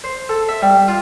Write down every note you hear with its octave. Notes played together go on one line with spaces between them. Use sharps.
C5
A4
E5
G3
F4